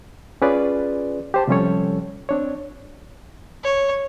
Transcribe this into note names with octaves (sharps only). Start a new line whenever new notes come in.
C#4 F4 G#4 B4 D5
G4 C5 A5
C3 F3 G3 C#4 A4 C#5
C4 D4 C#5
C#5